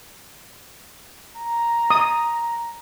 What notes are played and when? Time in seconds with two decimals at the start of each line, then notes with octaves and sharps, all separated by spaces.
1.36 A#5
1.90 D#6